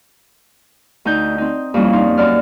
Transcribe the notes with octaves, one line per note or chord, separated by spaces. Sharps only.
D2 D#4 G6
C4 D#4
F2 G3 A#3 C#4 E4
D#4 F4
F#2 D5 F6